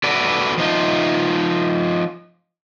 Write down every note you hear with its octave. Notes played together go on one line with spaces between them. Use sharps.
F#4 A4 B4 D5
F3 D#4 F4